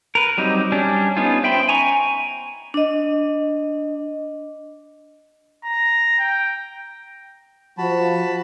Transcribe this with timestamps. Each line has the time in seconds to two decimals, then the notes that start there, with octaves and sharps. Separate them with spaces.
0.15 A#4 B4
0.38 F#3 G3 C4 D#4
0.72 G3 C#4 D4
1.17 B3 C#4 D#4 F4
1.43 C5 E5 G5 B5 C6
1.69 G#5 A#5 C#6
2.74 D4 D#5
5.64 A#5
6.19 G5
7.78 F3 F#4 A5 B5